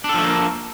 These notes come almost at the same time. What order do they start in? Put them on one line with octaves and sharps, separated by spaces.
D4 A4 F3 A3 A#3